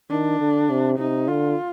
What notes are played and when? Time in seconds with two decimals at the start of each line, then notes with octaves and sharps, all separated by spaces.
0.10 D#3 D4
0.40 D3
0.69 C3
0.98 C3 D#4
1.28 D3 F4